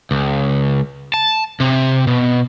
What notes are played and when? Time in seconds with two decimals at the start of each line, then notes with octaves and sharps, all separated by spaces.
0.11 C#2
1.14 A5
1.60 C3
2.07 B2